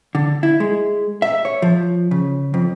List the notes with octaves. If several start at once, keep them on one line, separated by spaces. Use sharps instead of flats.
D3
E4
G#3
E5
C#5
F3
C#3
F2